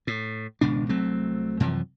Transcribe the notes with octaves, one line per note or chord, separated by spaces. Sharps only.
A2
G#1 C#2 B2 D4
C2 F#3 A3 C4
F#2 C3 E3 F3